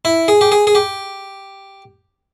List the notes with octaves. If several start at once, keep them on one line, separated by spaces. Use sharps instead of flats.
E4
G#4
G4
G#4
G#4
G4